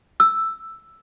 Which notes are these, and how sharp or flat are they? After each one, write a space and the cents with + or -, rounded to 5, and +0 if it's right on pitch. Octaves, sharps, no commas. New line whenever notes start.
E6 +5